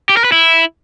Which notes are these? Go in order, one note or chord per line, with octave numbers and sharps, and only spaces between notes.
G4
A#4
B4
E4